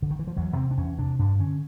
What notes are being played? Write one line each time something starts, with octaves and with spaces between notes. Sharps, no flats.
D3
D#3
E3
F3
E2 F#3
C3 C4
D4
E2 C#4
C3 D4
G2 D4
D3 C#4